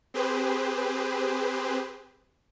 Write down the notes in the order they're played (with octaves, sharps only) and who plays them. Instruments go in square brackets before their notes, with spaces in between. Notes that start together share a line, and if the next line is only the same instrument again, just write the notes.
[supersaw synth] C4 G4 G#4 B4 C5